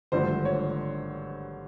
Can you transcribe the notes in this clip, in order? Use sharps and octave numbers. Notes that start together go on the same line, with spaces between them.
G#1 G2 D3 F3 A3 C5
C#5